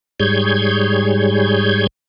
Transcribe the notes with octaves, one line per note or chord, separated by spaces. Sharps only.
G#2 G3 G#4 C#5 G6 G#6